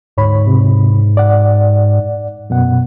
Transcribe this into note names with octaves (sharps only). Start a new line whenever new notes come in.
D2 G#2 C#5 B5
C3
D5 F#5
F#2 B2 F#5